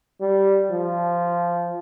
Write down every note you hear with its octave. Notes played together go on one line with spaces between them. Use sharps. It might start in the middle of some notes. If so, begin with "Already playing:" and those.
G3
F3